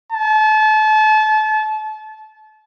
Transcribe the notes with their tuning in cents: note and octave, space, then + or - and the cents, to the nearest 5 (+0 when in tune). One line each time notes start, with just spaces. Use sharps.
A5 -30